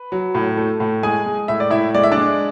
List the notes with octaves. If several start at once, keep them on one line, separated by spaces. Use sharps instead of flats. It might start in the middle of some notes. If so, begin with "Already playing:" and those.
Already playing: B4
F#3
A2
A3
A2
G#3 G#4 G#5
G#3
A2 E5
D5
A2 E4 E5
G#3 D5
E5
D4 D5
G#3